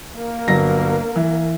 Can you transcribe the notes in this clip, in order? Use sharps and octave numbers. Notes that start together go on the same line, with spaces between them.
A#3 A#4
G1 F#3 A#6
E3